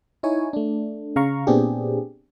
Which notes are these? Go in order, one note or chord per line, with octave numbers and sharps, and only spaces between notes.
D#4 E4 C#5 G#5
A3 D4
C#3 F5 A#5 C#6
A#2 B3 C4 D4 G4 G#4